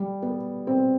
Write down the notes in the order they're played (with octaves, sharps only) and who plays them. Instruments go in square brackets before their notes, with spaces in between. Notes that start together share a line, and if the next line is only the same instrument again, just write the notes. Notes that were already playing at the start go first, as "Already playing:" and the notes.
Already playing: [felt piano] G3
B3
C4